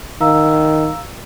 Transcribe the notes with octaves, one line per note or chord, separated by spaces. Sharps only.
D#3 F5 A#5 E6